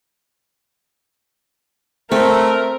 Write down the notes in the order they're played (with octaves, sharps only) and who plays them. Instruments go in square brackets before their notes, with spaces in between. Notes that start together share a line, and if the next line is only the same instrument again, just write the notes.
[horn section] A3 [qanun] C4 [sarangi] A#4